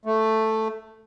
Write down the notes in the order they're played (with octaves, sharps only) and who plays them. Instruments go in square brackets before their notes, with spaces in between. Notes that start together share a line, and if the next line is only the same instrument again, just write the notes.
[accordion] A3